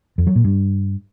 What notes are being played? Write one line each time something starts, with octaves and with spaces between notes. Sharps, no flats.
F2
F#3
A#2
G2